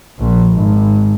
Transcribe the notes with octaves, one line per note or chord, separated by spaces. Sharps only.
A#1
G#1